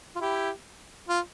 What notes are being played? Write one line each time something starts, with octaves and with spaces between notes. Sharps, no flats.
F4
E4 G4
F4